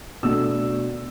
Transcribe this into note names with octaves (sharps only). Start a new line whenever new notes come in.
B2 A3 D4 E6